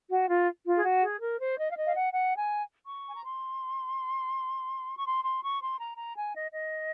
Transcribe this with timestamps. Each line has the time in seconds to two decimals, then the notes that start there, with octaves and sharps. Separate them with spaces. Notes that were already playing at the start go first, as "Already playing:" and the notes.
0.10 F#4
0.29 F4
0.66 F4
0.77 G#4
0.84 F#4
1.02 G#4
1.20 A#4
1.39 C5
1.57 D#5
1.71 F5
1.75 D#5
1.85 F5
1.94 F#5
2.12 F#5
2.37 G#5
2.85 C#6
3.08 G#5
3.14 A#5
3.23 C6
4.97 C#6
5.06 C6
5.23 C6
5.43 C#6
5.61 C6
5.78 A#5
5.97 A#5
6.16 G#5
6.34 D#5
6.53 D#5